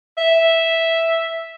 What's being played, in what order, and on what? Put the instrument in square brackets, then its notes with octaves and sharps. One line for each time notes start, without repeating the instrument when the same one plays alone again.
[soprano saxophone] E5